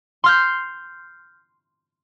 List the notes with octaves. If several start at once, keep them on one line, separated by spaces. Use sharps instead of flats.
C6 F6 G6